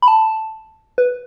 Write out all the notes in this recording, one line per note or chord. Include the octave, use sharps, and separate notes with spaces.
B5
A5
B4